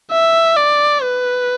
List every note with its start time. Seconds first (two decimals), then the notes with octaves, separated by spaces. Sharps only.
0.11 E5
0.56 D5
1.02 B4